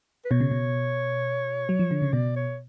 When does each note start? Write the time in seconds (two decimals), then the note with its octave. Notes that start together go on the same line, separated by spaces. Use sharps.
0.25 B4
0.31 B2 C#5
0.41 C#3
0.51 B2
1.69 F#3
1.79 F3
1.91 D3
2.02 C#3
2.13 B2 D5
2.36 C#5